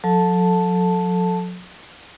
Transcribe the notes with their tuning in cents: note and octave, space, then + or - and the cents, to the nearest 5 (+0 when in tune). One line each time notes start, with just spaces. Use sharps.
F#3 -45 A4 -5 A5 +0